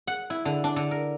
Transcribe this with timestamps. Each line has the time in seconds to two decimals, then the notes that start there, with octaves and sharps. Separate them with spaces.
0.07 F#5
0.30 E4
0.45 D3
0.64 D4
0.76 D3
0.91 A#4